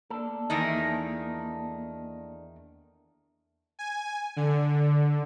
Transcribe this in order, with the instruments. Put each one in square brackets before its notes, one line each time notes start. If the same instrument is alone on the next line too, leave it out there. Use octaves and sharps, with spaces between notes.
[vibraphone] A#3 [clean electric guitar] D4 A4
[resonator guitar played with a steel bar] E2 D#3 D#4
[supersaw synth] G#5
D3